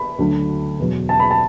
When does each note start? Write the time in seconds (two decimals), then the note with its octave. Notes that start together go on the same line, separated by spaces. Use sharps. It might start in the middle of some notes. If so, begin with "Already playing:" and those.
Already playing: B5
0.19 D2 D3 F#3
0.79 E2 B2 F#3
1.09 A5
1.19 B5
1.31 A5